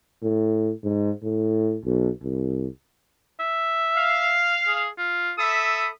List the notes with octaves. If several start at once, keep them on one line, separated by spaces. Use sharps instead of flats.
A2
G#2
A2
B1
C2
E5
F5
G#4
F4
A4 E5 B5 D#6